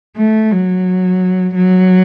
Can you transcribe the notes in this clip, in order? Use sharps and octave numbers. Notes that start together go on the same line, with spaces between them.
A3
F#3
F#3